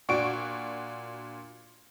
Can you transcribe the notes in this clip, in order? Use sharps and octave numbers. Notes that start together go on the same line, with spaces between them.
A#2 D4 F#4 C#6 D7